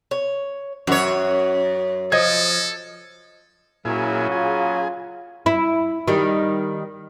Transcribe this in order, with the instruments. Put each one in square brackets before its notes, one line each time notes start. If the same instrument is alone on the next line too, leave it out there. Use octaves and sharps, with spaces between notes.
[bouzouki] C#5
[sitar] F#2 C#5 [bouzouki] F#4
[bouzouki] F3 [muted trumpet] A4 [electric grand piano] D#5 G#6
[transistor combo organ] A#2 E4 G#4 [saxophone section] C#3 F#3
[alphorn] F4 [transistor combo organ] G#4
[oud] E4
D#3 G3